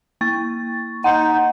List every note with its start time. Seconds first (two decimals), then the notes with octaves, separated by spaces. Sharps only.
0.21 A#3 C#6 A6
1.04 D#4 F#5 C6 G6